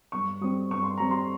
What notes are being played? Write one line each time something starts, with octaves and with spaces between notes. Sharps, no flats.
G2 C#6
G3 C4 D#6
G2 C#6
C6
G3 C4 A#5
C6